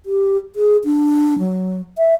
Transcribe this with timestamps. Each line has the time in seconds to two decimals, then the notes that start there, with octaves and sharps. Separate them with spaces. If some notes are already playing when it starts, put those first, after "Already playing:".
0.06 G4
0.56 G#4
0.84 D4
1.39 F#3
1.98 E5